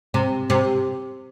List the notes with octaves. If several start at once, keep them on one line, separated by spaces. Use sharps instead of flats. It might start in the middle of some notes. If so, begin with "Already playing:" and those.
C3
C3